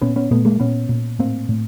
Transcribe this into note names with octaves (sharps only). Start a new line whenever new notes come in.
A#2 B3 C#4
B3 C#4
A#2 A3 B3
G#3 A#3
A#2 B3 C#4
A#2
A2 A#3 C4
A2